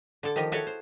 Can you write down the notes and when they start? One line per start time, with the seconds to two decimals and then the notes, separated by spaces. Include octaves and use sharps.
0.23 D3 A4
0.36 D#3 F3 G4 D#5
0.52 E4 F#4 G#4 A4 C#5
0.67 C5